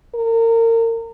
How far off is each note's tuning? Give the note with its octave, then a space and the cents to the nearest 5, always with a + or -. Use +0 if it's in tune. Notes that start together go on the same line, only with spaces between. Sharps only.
A#4 -30